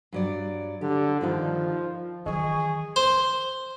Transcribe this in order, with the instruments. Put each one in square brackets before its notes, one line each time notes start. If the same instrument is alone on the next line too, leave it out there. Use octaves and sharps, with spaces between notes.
[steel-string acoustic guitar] G2 F#3 D5
[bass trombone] D3 [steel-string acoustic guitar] G4
[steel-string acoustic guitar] G2 D#3 D#4 [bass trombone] F3
[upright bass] D#3 E3 [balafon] F#3 [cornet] G#4 [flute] C#6
[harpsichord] C5